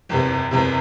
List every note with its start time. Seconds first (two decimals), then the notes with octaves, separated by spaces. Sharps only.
0.09 F#1 E2 C3
0.51 F#1 E2 C3